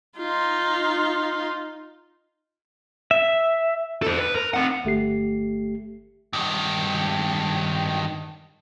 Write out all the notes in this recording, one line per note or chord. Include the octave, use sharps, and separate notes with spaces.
D#4 F4
E5
A4 C5
B4
A#4
C4 F#5
G1 A3 G4 C7
G2 D#3